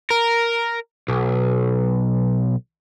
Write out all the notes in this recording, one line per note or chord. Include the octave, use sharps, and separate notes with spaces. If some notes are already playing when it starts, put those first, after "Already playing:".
A#4
B1